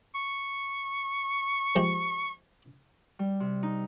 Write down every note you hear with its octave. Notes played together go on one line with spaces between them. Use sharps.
C#6
F3 G#3 G4
G3
C3
D#4